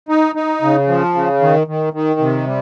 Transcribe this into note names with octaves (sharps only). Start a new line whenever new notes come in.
D#4
D#4
C#3
F3
C#3
D#3
D#3
D#3
C3
G3